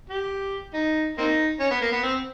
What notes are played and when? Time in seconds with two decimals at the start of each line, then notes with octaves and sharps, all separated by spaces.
0.10 G4
0.74 D#4
1.18 A#3 C4 D#4
1.60 C#4
1.71 B3
1.81 A#3
1.92 B3
2.03 C4